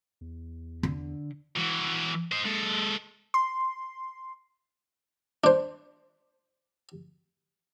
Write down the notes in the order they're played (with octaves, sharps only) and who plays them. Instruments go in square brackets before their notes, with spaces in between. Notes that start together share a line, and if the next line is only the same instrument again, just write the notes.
[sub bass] E2
[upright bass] D3
[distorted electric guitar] E3 F#4
D#4 C5
G#3 A4
[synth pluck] C6
[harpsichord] D4 C5